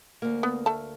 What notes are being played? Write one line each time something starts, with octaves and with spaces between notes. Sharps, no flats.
D2 A#3
B3
A3 A5